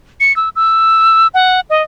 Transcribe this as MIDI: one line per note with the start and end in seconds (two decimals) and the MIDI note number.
0.20 0.35 97
0.36 0.49 88
0.56 1.27 88
1.34 1.60 78
1.70 1.82 75